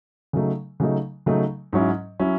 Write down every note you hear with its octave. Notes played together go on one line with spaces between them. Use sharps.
C#3 F#3 A3 D#4
C#3 F#3 A3 D#4
C#3 F#3 A3 D#4
G#2 F#3 C#4 E4
F#3 C#4 E4